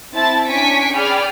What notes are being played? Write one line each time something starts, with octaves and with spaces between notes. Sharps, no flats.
C4 E4 A5 A6
C#4 D4 G#5 C#6 B6 D7
G#4 D5 G5 B5 F6